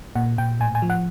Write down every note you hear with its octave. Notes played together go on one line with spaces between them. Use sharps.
A#2 F#5
A#2 G5
A2 G#5
G#5
F3
F#5